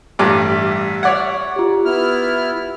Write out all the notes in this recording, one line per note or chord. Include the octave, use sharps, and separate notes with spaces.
A1 G2 E5 D6
C#5 D5 F#5 G#6
F4 G4
B3 E4 F6